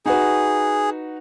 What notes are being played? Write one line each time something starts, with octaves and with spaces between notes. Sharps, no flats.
D#4 F#4 G#4 B4